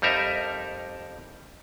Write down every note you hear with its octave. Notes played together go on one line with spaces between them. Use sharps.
F2 G3 D#4 A#4 E5